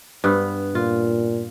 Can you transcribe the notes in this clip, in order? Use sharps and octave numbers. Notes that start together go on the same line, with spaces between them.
G2 B3
A#2 F4